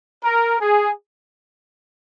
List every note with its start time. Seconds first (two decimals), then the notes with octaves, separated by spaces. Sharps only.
0.24 A#4
0.60 G#4